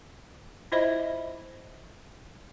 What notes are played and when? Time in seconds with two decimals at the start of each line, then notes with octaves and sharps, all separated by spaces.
0.72 E4 F4 C5 D#5 E5 B5